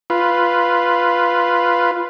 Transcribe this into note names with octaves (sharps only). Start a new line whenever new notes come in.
F4 B4